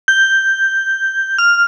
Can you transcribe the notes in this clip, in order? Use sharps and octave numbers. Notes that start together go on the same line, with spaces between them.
G6
F6